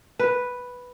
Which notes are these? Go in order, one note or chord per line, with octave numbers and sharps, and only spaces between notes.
B4